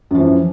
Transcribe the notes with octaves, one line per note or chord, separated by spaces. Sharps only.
F#2 E3 F3